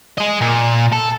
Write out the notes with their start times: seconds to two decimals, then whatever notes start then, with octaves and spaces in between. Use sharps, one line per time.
0.18 G#4 D#5
0.42 A#2
0.92 A4